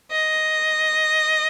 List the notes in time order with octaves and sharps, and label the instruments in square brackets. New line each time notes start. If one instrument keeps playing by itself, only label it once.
[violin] D#5